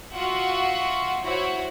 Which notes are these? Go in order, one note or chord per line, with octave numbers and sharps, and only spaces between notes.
F4 F#4 E5 F#5
E4 F#4 C5 C#5